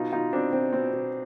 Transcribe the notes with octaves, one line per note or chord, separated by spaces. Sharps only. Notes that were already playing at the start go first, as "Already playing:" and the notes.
Already playing: B2 D#4 F4
B2 D#4 F4
B2 C4 D4
B2 C4
B2 C4
B2